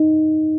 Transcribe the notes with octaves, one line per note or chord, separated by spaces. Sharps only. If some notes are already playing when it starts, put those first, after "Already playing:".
Already playing: D#4